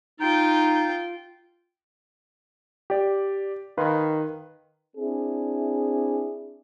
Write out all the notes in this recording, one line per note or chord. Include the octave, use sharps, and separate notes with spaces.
D#4 F4 G5
G4 D5
D#3 B4 F5 C6
C4 D4 E4 G#4